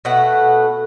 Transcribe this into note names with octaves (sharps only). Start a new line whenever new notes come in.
B2 A3 F#5